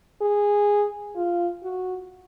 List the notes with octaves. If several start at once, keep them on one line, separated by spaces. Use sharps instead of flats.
G#4
F4
F#4